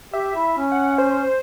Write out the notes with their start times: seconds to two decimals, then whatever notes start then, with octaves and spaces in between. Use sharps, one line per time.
0.13 G4 E5
0.36 E4
0.57 C#4
0.72 F#5
0.98 C5